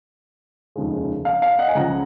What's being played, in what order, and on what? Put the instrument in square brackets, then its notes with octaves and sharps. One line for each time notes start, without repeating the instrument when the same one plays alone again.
[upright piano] F1 D#2 C#3 F3 G#3
F5
F5
D#5 F#5
G#5
C#2 C#3 F3 F#5 A#5